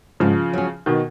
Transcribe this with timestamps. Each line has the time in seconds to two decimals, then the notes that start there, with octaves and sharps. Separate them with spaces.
0.20 G#2 C#3 F3
0.53 F#3 C#4
0.86 B2 D#3